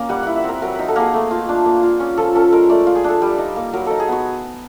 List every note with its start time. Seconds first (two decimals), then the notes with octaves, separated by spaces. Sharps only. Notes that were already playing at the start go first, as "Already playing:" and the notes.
Already playing: A#3 C#4
0.09 G3 F#5
0.23 E4 F#5
0.36 E5
0.44 C4 A#4
0.62 F#3 A#4
0.75 D#4 B4
0.88 A4
0.96 A#3 G#4
1.14 A3
1.31 F4
1.49 D4
1.66 A#3
1.83 F4
2.00 C#4
2.17 F3 A4
2.35 C#4 A4
2.52 G#3 A#4
2.69 A3 D5
2.87 F4
2.95 G#4
3.04 D4 A4
3.22 G3
3.38 D#4
3.56 A#3
3.73 F#3 A#4
3.86 D#4 A4
4.00 G#4
4.08 B3 F#4